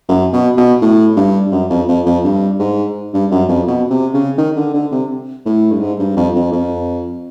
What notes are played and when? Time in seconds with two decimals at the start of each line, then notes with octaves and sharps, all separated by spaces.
0.09 F#2
0.33 B2
0.57 B2
0.81 A2
1.17 G2
1.52 F#2
1.70 F2
1.88 F2
2.06 F2
2.24 G2
2.59 G#2
3.14 G2
3.31 F#2
3.49 F2
3.67 B2
3.90 C3
4.14 C#3
4.38 D#3
4.56 D3
4.74 D3
4.92 C3
5.45 A2
5.72 G2
5.80 G#2
5.99 G2
6.16 F2
6.35 F2
6.52 F2